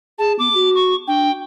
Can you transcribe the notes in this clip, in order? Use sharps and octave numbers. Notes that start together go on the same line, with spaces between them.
G#4 A5
B3 D6
F#4
C#6
D4 G5